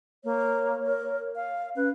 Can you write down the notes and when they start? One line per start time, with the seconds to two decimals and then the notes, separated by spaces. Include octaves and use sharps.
0.24 A#3 C#5
0.85 A#4
1.35 F5
1.76 C#4 B4